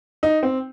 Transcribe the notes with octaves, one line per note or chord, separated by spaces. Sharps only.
D#4
C4